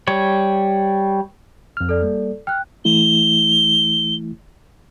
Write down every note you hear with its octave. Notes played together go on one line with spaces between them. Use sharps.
G3 C#5
F2 F6
A4 D5
G3 A#3
G5 F6 F#6
E3 A3 E4 G7